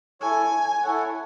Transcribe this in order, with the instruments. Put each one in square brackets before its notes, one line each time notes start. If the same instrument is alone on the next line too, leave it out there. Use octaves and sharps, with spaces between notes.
[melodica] E4 A4 C#5 [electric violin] G#5
[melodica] E4 A4 C#5 F#5